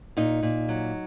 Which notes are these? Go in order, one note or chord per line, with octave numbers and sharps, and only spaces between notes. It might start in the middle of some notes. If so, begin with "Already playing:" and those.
A#2 D#4
A#2
F#3